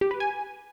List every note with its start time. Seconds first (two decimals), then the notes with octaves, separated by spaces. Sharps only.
0.01 G4
0.11 B4
0.20 G#5